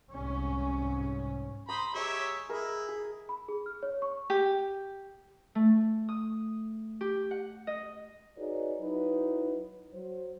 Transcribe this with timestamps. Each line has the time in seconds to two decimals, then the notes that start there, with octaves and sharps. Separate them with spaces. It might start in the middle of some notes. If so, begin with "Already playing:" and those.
0.12 C2 G#2 C#4
1.69 C5 A#5 B5 D#6
1.95 G#3 G4 C#5 D#5 E5 A#5
2.49 E4 G#4 A#4 D#5
2.89 G#4
3.29 B5
3.48 G#4
3.66 F6
3.83 C#5
4.02 C#6
4.30 G4
5.55 A3
6.09 D#6
7.01 G4
7.31 F#5
7.67 D#5
8.37 D#4 F#4 G#4 B4 C#5 D5
8.80 F#3 D#4 E4 B4
9.93 F#3 C5